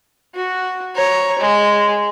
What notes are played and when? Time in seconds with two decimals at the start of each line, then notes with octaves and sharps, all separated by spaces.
0.35 F#4
0.95 C#5 A#5
1.39 G#3